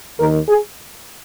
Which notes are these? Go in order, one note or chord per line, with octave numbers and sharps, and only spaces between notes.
D#2 D#3 A#4
G#4